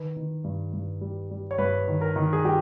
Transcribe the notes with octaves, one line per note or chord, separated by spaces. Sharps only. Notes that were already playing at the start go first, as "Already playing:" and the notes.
Already playing: D#3 B4
D#3
G2
G2
G3
G3
C#5
G2 B4
D#3
A#4
D#3
G#4
G3 G4